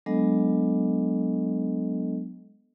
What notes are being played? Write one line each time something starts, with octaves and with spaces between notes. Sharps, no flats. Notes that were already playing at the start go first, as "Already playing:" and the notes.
F#3 G#3 B3 D4 A4 D#5